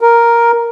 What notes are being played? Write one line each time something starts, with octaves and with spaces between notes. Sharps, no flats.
A#4